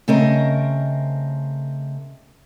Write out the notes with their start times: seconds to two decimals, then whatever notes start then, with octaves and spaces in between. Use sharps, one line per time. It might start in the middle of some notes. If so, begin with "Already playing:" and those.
0.08 C#3 A3 C4 A#4 D#5